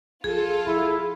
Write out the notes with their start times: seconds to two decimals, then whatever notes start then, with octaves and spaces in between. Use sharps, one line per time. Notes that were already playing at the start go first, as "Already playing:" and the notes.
0.24 A#1 F4 G#4 A4
0.67 A#1 E4